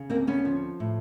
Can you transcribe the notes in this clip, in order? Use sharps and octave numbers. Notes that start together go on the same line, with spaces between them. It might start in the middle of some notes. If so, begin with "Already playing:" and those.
Already playing: C#3
D2 A#3 C4
B3 C#4
F3
A2